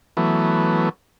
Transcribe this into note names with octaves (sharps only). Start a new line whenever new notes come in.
E3 F#3 A3 B3